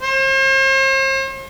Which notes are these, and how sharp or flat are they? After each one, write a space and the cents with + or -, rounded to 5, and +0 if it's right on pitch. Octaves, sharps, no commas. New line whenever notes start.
C5 +45